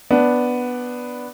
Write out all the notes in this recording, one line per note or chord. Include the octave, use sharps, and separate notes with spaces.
B3 D4